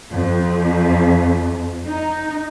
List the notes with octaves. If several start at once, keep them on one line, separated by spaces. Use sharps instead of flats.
F2
D#4